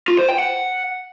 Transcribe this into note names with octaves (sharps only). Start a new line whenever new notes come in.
F4
C5
G5
F#5